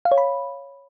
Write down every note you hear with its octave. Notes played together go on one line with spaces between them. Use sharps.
F5
C#5
B5